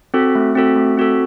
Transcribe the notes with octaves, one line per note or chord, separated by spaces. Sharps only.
C4 F#4 A4
A3
C4 F#4 A4
A3
C4 F#4 A4